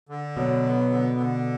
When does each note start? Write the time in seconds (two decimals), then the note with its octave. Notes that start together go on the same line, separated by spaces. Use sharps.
0.09 D3
0.36 B2 F#3
0.63 B3
0.90 D3
1.17 D3